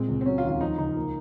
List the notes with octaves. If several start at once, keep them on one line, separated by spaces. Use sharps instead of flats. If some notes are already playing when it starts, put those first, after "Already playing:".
Already playing: A#2 G#3 C4
C#2
C4
F#3 C#4
F4
D#2
F4
F3 D#4
C#2 D#4
A#3